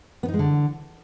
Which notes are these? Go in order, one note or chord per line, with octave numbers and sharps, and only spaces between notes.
B3
D#4
G#3
D3